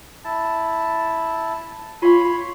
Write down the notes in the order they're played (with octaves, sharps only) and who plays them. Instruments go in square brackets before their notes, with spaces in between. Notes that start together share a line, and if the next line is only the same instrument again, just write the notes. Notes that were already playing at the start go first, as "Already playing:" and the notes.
[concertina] E4 A5
[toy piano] F4 F5 [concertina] C#5 B5 C6